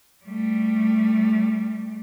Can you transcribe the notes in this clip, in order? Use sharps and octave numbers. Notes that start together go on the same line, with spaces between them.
G3 A3